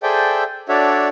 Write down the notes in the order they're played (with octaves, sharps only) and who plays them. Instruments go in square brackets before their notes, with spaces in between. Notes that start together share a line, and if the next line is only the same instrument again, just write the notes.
[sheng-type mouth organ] G#4 A4 C5 D5 E5 G5
D4 F#4 A4 C#5 D5 E5